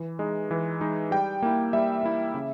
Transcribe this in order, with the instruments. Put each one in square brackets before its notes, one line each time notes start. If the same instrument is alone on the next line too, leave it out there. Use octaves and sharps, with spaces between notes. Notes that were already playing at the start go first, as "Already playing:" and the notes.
Already playing: [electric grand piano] E3
G#3 D#4
E3
G#3 D#4
G3 G5
A#3 E4
G3 E5
A#3 E4
C#3